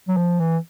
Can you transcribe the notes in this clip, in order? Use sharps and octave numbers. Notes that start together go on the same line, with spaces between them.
F#3
F3
E3